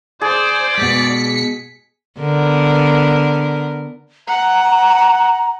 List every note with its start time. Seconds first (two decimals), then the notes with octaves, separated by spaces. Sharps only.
0.21 G#4 C5 D5
0.78 B2 G#3 B6 C#7
2.19 D3 B3 A#4
4.28 F#5 A#5